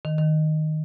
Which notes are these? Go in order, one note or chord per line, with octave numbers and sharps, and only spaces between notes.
D#3
D#3